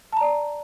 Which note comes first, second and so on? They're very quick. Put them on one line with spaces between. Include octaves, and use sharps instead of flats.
A5 A#5 D5